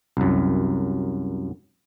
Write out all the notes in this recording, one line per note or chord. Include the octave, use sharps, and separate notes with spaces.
C2 F#2